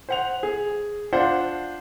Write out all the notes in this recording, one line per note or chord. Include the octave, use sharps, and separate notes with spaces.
C5 F#5 F7
G#4
D4 F4 C5 F#5